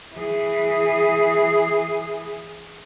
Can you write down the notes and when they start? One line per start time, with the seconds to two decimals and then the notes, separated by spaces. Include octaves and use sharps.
0.15 E3 G#4